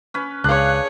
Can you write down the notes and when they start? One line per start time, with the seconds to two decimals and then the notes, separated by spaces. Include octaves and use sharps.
0.14 C#4 B4
0.44 C#2 D4 G#4 C#5 F5 F#6